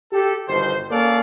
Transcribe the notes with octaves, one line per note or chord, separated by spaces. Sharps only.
G4 A4
G1 B2 D#3 C5
A#3 C#4 A4 A#4 D5 F5